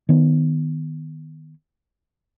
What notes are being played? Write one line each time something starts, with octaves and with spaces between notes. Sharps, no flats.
D#3 B3